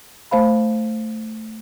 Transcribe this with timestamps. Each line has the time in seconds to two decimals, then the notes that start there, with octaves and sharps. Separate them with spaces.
0.31 A3 C5 F5 B5